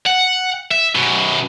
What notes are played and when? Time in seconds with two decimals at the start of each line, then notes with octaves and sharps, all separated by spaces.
0.07 F#5
0.71 E5
0.95 F#2 B2